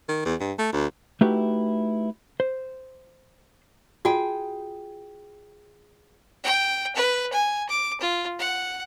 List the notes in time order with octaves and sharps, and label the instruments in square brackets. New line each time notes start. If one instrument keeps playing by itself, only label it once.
[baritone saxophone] D#3
E2
G2
A3
D2
[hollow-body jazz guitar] A3 D#4 E4 F#4 G4 B4
C5
[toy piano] F4 F#4 [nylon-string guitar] G#4 G5
[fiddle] G5
B4
G#5
D6
F4
F#5